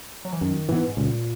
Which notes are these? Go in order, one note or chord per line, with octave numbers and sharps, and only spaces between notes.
F#3
E3
F#2 D#3
G#2 E3 B3
G#2
C#2 A#2